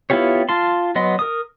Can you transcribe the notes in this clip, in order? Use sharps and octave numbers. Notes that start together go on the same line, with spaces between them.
B3 E4 F4 G4 C#5
F4 A5 C6
F#3 B3 D#5 C6
A#4 D#6